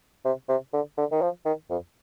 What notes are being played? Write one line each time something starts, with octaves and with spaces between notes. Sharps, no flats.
C3
C3
D3
D3
D#3
F3
D#3
F2